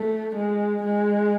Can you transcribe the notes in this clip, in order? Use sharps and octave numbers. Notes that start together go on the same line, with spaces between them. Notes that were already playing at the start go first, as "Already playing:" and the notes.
Already playing: A3
G#3
G#3